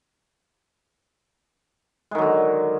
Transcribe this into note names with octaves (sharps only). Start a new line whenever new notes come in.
D3 D#3 F#3 G#3